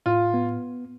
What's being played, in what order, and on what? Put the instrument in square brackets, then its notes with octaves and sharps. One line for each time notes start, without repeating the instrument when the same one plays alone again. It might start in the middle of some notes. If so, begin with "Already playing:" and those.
[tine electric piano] A2 [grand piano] F4
[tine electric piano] B3